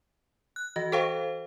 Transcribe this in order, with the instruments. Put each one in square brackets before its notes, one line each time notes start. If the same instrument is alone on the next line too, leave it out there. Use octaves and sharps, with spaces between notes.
[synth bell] F#6
[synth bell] E3 F#4 [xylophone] D#5
[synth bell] A4 C5 F5 [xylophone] D#5 G5 C#6